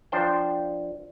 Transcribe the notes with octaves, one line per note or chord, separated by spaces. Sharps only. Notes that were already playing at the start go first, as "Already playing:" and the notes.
F3 D4 C5 G5